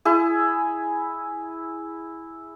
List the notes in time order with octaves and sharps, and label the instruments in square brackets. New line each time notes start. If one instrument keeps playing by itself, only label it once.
[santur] E4 G#4